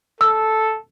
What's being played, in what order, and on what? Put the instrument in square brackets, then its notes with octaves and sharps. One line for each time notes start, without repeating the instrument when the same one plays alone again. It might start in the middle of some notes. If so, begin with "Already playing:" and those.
[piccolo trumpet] A4 [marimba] E6